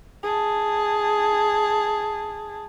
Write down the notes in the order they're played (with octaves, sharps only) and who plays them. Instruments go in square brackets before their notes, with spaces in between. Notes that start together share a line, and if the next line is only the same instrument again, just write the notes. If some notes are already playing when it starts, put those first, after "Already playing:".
[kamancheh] G#4 A5